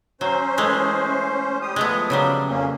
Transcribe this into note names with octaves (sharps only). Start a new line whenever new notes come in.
F#3 C#4 C5
E3 G#3 A3
G3 G4 D#6
F3 G#3 A3 B3
C#3 F#3 G3
F2 A#3 C#4